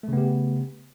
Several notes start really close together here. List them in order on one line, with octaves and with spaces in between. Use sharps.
A3 C#3 B3 G4